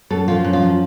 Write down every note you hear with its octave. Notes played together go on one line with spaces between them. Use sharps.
F#2 A4
F3 F4
F#2
F4
F3